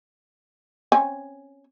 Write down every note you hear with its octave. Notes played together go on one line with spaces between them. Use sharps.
C4 C#4 G#5